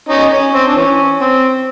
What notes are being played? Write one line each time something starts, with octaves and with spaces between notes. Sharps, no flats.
C#4 D#4
C#4
C4
D4
E3 C#4
C4